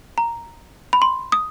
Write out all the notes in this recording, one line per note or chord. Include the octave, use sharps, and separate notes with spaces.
A#5
B5
C6
D#6